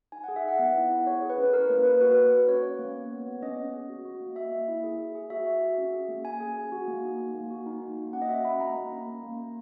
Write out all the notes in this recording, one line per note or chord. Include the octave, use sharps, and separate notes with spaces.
D#4 G#5
G#4 F#5
E5
D#4 F#5
B3
E4
E4
G#4 C#5
G#4
B4
C#4
E4 A#4
A#3 B4
A#3 B4
F#4 B4
F#4
F#4
C#4 C#5
C#4
A#3
B3
B3
B3
C#4 D#5
C#4
G#4
F#4
F#4
A#3
A#3 E5
A#3
E4
G#4
G#4
G#4
F#4 E5
F#4
F#4
C#4
G#4
A#3
C#4 G#5
G#4
G#4
F#4
A#3
D#4
D#4
A#3
F#4
D#4
A#3
A#3
C#4 F#5
D#5
F#4 E5
F#4 B5
A#3 A#5
A#3
C#4
A#3
A#3
A#3